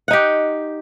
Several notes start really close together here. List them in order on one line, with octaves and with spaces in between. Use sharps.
F#5 D#4 G4